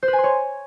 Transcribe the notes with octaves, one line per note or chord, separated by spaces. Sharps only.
C5
B4
G#5
C6
C#5